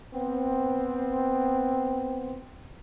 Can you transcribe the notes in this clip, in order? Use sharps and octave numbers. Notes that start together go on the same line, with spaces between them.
B3 C4